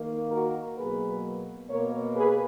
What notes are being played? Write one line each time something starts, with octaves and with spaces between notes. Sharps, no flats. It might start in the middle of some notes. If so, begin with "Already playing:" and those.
Already playing: D#3 A#3
F#4 A#4
B2 F#3 A#3 G#4 B4
B2 A#3 A#4 C#5
G#4 B4